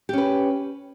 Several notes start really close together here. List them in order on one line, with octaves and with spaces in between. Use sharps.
G4 C#4 B4